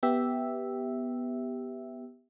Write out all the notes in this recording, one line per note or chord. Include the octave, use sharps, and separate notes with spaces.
B3 G4 E5